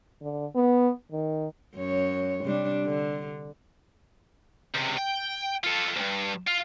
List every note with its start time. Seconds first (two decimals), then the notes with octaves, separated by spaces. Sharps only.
0.21 D3
0.55 B3
1.12 D#3
1.76 F#2 C#5
2.45 C3 G3 D4
2.85 D3
4.74 C#2 C3
4.97 G5
5.64 F4 A4
5.96 D2 G2
6.47 F4